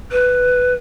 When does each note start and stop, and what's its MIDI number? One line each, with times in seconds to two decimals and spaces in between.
0.12 0.74 71